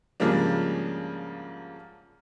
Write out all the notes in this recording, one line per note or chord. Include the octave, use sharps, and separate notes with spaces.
G#2 C#3 F3 G3 A#3 D4